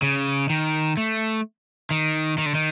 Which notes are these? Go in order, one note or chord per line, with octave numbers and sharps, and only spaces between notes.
C#3
D#3
A3
D#3
D#3
D3
D#3